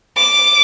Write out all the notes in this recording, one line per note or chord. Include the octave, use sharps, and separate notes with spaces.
D6